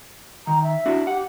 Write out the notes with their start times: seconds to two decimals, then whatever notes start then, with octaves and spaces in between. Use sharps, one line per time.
0.47 D#3 A#5
0.63 E5
0.86 D4 E4 F#4
1.07 G4 F#5